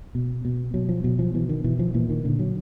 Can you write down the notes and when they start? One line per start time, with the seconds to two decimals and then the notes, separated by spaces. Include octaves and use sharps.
0.15 B2
0.45 B2
0.74 B2 F#3
0.89 F3
1.04 B2 F#3
1.19 F3
1.34 B2 E3
1.49 D#3
1.64 B2 E3
1.79 F3
1.94 A#2 E3
2.09 D#3
2.25 A#2 D3
2.39 F#3